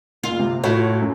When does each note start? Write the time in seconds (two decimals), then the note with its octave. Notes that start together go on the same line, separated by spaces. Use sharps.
0.23 F#1 F4
0.39 C3
0.64 A2 F4 F#4 C#5
1.01 F#2